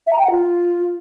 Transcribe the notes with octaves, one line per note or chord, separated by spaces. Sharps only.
E5
A#5
G5
F#5
F4